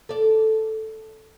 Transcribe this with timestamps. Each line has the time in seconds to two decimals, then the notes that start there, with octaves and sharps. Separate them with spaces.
0.09 A4 D5